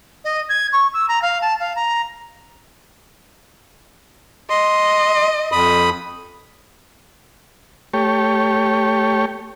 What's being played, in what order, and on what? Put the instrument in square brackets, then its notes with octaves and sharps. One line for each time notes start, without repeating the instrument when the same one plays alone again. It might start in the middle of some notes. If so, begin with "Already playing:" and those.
[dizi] D#5
G#6
C#6
E6
A#5
F5
A5
F5
A#5
[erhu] D#5 [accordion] C6
[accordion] F2 B5 D#6
[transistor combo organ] A3 G4 C#5